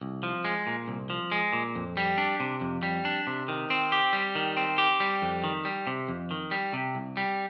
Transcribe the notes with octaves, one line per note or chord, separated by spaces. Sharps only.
C2
F3
G#3
A#2
C2
F3
G#3
A#2
F2
G3
D4
C3
F2
G3
D4
C3
D#3
C4
G4
G3
D#3
C4
G4
G3
F2
D#3
G3
C3
F2
D#3
G3
C3
C2
G3